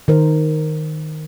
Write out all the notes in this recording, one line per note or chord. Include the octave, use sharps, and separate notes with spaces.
D#3 A#4 C5